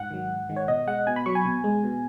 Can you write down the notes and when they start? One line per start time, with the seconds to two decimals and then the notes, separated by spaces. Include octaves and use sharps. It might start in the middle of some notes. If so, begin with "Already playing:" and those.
Already playing: G#2 F#5
0.10 D#3 F#3
0.30 G#2
0.49 D#3 G#3
0.56 C#5
0.68 B2 D#5
0.87 G#3 F#5
1.07 B2 G#5
1.16 B5
1.26 F#3 C#6
1.35 G#5
1.45 B2
1.64 G#3
1.84 B2